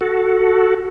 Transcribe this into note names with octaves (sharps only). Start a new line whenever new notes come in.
F#4 A4